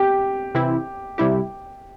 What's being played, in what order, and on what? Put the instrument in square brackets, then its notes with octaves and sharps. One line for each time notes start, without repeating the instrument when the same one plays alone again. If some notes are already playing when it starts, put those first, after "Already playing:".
Already playing: [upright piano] G4
[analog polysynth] C3 E3 C4 E4
C3 G3 E4 G4